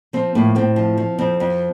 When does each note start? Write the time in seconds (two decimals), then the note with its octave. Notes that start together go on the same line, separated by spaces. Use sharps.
0.13 F3 C4
0.35 A2 A#3
0.55 A2 C4
0.76 F3
0.97 F3
1.18 F2 C4
1.40 F2